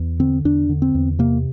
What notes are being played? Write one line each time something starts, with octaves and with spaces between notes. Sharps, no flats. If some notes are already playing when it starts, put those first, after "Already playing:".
Already playing: E2
D3 C4
E2 D4
D3
C4
E2
C3 A#3